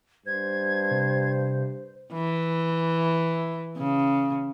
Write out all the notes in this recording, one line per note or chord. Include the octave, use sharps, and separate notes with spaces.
G2 C5 G#6
C3
E3
C#3